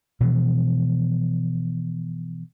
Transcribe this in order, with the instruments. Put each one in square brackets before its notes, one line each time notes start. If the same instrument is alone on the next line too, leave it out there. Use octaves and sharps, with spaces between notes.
[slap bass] B2 E3 F3